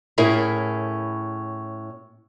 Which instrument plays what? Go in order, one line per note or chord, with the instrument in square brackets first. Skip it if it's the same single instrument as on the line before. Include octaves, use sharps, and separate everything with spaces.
[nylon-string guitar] A2 C#4 E4 G#4 A#4